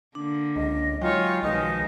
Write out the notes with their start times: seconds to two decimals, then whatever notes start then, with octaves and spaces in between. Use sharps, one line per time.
0.15 D3 A#3 D4
0.56 C#2 D#5
1.01 F#3 G#3 D#4 F4 C#5 G5
1.43 B1 D#3 F3 G#3 D#4 F#4 B4 D#5